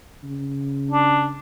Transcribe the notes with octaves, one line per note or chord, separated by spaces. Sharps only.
C#3
D4